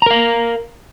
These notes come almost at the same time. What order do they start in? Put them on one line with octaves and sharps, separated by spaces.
A#5 A#4 F5